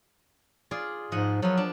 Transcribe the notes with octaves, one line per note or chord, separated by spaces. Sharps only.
F4 G#4 D5
G#2 F3 D#5 F#5
F3 F#3 B3
D4